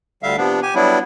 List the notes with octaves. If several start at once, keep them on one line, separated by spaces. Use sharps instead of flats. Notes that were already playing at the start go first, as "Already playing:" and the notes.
D2 D3 G3 E5 F5
C3 F3 B3 D4
G4 G#5
F#3 G3 B3 D4 E4